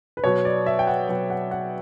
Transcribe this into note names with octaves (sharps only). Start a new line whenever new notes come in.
B4
B2 F#3 B3 C#5
D5
E5
G5
F#5
B2 F#3 B3 G5
F#5
F#5